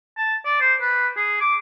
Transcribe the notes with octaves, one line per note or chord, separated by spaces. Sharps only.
A5
D5
C5
B4
G#4
D6